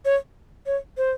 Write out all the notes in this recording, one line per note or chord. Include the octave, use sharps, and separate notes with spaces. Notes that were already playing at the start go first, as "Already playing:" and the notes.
C#5
C#5
C5